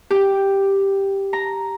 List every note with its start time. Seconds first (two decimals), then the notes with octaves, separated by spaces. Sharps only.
0.11 G4 G5
1.33 A#5